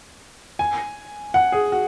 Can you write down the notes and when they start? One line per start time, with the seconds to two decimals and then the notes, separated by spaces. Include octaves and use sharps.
0.59 G#5
1.34 F#5
1.52 G#4
1.72 F#4